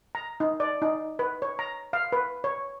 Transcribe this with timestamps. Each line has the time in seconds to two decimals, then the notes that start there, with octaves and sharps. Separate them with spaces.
0.15 A#5
0.40 D#4
0.60 D5
0.82 D#4
1.19 B4
1.42 C#5
1.59 A#5
1.93 F5
2.12 B4
2.44 C#5